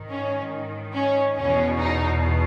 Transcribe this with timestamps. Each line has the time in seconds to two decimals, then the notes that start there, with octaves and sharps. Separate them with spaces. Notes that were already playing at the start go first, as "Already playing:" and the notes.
Already playing: G#2 D#3
0.10 C#4
0.94 C#4
1.37 E2 B2 C#4
1.79 D#4